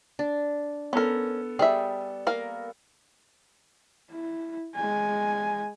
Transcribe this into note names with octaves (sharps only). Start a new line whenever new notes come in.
D4
B3 C#4 A4 A#4
G3 G#4 E5
A#3 A#4 F5
E4
G#3 G#5